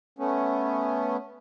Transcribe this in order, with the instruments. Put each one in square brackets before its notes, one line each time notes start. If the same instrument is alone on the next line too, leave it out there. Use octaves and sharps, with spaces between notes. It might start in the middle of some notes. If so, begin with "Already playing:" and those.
[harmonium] A3 B3 C#4